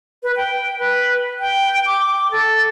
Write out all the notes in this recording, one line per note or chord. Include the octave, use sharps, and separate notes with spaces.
B4
G5
B4
G5
D6
A4